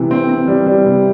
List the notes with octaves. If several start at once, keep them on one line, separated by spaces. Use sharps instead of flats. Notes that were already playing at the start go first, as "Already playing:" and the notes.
Already playing: C3 E3
C4
C4
G3
G3
C3